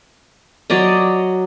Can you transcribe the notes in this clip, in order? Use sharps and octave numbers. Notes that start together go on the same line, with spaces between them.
F#3 F#4 D5 D#5